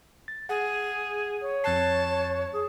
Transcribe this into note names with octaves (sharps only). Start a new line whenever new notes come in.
A6
G#4 F#5
C#5
F2 A5 F#6 C7
G#4